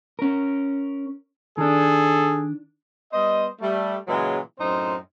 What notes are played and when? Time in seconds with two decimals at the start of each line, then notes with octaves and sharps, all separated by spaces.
0.19 C#4 A#4
1.58 D#3 D4 G#4 A4
3.13 G3 B3 C5 D#5
3.61 G3 A3
4.07 A#2 C#3 E3 F#3 G#3
4.59 F#2 A2 C4 D#4 C5